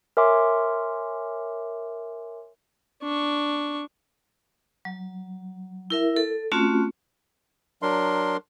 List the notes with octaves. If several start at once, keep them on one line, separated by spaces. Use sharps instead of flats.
A#4 C#5 E5 G#5 C6 D6
D4 C#6
F#3
E4 A#4 E5
A4
A3 C4 C#4 F4 F#4
F#3 D4 A#4 C6